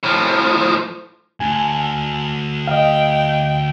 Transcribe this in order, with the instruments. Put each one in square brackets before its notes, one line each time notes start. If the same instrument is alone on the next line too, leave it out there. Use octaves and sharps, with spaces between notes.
[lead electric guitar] A2 F3
[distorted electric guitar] D2 [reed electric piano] G#5
[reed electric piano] D#5 F5 [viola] G5